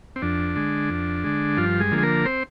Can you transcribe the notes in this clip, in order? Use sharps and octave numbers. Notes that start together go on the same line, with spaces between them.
C4
F2 D4
D3 G#3
F2
D3 G#3
G2 F3 F4
G#3 G#4
D3 F3 A#3
G#4
A#3 A#4
C4 C5